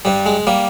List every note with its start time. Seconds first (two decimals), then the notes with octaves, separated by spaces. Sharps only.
0.05 G2 G3
0.26 G#3
0.47 G3 A#3